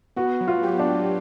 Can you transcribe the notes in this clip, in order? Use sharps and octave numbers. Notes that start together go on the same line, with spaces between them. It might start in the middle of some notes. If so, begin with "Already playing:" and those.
B3 F#4
F#3
F4
G4
D4
B3